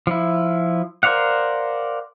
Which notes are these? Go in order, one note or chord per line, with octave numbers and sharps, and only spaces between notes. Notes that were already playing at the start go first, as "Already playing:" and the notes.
F3 E4
A#4 C5 D5 F5 F#5